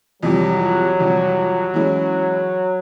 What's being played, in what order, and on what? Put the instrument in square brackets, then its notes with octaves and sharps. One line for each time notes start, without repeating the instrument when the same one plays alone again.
[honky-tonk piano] F2 C3 E3 G3 [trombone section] F#3
[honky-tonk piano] F2 C3 E3 G3
E3 G#3 C#4 E4